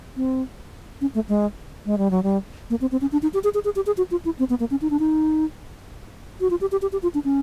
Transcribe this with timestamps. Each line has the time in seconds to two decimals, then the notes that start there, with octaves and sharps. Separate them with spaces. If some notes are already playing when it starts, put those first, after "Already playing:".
0.17 C4
1.01 C#4
1.15 A3
1.29 G#3
1.86 G#3
1.98 G3
2.11 F#3
2.23 G3
2.70 A#3
2.81 C4
2.92 C4
3.01 C#4
3.12 D4
3.23 D#4
3.34 G4
3.44 G#4
3.54 G#4
3.65 G#4
3.76 G4
3.86 G#4
3.97 F#4
4.11 F4
4.25 E4
4.39 C4
4.50 B3
4.60 A#3
4.71 C#4
4.82 D#4
4.90 D4
4.99 D#4
6.41 F#4
6.50 F4
6.61 G4
6.72 G4
6.82 G4
6.92 G4
7.03 F4
7.14 D4
7.24 C#4